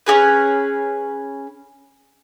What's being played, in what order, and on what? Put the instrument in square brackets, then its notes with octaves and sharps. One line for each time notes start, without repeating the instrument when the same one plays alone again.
[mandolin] C#4 D#4 G#4 B4